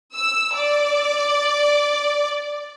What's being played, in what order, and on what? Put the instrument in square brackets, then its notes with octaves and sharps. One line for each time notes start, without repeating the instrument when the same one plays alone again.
[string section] E6
D5